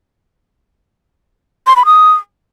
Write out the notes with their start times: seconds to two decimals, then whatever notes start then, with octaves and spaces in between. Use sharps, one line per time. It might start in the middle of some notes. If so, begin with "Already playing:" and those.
1.67 C6
1.76 B5
1.86 D#6